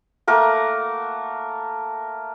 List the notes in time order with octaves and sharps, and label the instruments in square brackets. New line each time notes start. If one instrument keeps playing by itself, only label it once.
[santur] A3 A#3 A#4 F#5